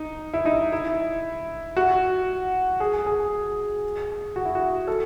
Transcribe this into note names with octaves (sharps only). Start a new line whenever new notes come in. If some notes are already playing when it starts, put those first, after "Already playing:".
Already playing: D#4
E4
D#4
E4
F#4
G#4
G#4
F#4
E4
F#4
A4